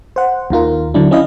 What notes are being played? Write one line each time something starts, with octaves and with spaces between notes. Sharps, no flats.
C5 F#5
D#2 D#3 F4 A#4
D3 F#3 D4 E4
C#4 E4 D#5 F5